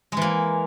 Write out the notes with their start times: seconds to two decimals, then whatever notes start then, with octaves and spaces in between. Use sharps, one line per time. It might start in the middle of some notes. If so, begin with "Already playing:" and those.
0.12 G#3
0.17 E3
0.21 A#3